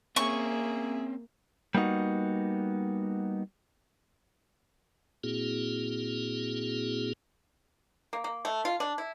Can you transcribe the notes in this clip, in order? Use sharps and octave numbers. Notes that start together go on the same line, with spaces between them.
A#3 C4 C#4 G#4 E5 C#6
G3 A#3 B3 D#4 F#4
A#2 A#3 C4 E4 F#4 G#4
A#3
A#3
A3
F4
D4
E4